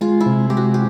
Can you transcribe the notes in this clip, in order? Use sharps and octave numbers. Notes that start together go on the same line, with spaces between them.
G#3 F4
E4
C3
G#3 G4
F#4
G4